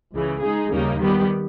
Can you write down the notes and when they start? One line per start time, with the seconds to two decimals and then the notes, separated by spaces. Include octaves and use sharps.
0.14 C#2 C#3 E3
0.42 G#3 D#4 G#4
0.71 D#2 C#3 G3 A#3 D#4
1.00 D#3 G3 B3 G4